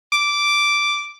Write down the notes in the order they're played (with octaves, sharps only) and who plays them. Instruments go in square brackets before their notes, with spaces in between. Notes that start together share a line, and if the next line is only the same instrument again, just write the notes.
[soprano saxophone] D6